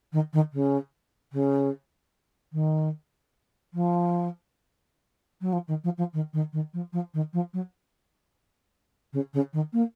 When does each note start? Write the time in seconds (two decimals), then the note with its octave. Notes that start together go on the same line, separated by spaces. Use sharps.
0.13 D#3
0.33 D#3
0.53 C#3
1.33 C#3
2.53 D#3
3.74 F3
5.41 F#3
5.53 F3
5.68 D#3
5.84 F3
5.98 F3
6.13 D#3
6.33 D#3
6.53 D#3
6.73 F3
6.93 F3
7.14 D#3
7.33 F3
7.53 F#3
9.13 C#3
9.34 C#3
9.53 D#3
9.73 A#3